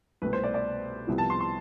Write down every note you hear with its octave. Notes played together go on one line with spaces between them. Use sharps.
C2 B2 A3 B4
C5
D5
D5
C2 C3 F3 B3 E4
A5
C6
C6